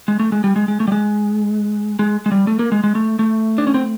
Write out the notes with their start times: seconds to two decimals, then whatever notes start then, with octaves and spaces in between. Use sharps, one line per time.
0.08 G#3
0.19 A3
0.32 G#3
0.44 G3
0.56 G#3
0.68 G#3
0.80 A3
0.88 G3
0.92 G#3
1.99 G#3
2.26 G#3
2.32 G3
2.47 A3
2.59 A#3
2.72 G#3
2.84 G#3
2.95 A3
3.19 A3
3.58 D4
3.67 C#4
3.74 C4